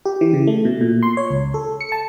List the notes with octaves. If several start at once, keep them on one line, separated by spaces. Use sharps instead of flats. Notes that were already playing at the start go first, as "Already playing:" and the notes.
G4
E3
C#3
A3
B2
A#2
C6
C#5
C#2
A4
C#7
A5